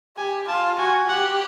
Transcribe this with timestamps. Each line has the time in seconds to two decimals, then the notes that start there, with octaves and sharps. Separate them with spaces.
0.17 G4 G#5
0.48 F4 A5
0.79 F#4 G#5
1.09 G4 F#5